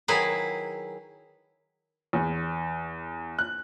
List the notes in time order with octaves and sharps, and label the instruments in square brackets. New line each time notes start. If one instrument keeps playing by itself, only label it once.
[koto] D#3 F#3 E4 G#4 B4
[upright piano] E2
F#6